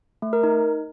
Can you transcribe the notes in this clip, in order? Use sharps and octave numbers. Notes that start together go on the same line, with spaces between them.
A3
A#4
D#4